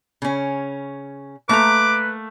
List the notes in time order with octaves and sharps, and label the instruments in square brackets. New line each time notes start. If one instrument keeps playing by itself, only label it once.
[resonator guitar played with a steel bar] C#3 C#4
[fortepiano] A3 [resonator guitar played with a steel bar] A#3 A#5 [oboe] B4 [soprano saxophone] D6